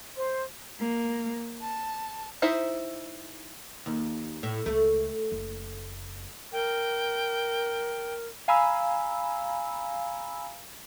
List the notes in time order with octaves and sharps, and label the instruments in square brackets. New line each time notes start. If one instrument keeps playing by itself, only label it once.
[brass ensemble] C5
[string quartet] A#3
A5
[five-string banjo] D#4 E4 C5 E5
[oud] D#2
A2
[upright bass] C#2 [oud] A3
[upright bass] F#1
[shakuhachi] A#4 [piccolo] G5
[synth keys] F5 G#5 A#5 B5 E6